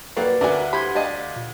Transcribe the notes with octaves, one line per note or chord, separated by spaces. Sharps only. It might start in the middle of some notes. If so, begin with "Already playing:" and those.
F#3 A#3 F#4 G4 B4 D5 F5
D2 F#4 A#4 D5 E5 G#5 D6
E3 G4 C5 B5 C6 G#6 B6
D4 G4 D#5 F5
A#2